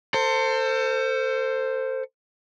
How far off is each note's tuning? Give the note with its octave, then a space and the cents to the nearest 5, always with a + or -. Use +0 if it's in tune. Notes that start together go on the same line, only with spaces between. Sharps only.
A4 +35 C5 +0